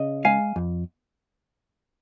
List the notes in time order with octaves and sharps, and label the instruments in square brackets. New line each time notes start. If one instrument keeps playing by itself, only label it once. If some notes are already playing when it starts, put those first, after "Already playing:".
Already playing: [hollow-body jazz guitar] C#3 D#5
G#3 F5 G#5
F2